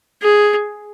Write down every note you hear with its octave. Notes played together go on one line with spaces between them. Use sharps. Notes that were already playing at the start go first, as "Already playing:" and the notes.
G#4